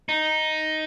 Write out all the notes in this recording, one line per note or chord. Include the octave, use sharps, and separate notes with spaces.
D#4